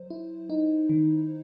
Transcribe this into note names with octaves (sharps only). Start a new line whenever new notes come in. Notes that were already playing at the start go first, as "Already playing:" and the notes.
Already playing: F#3 C5
E4
D#4
D#3